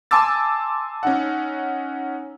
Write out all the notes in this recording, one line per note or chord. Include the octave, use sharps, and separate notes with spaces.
G#5 A5 C6 D6 E6 A6
C#4 D#4 F#5